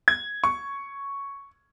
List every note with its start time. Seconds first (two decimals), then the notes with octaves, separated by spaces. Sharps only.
0.08 G#6
0.44 C#6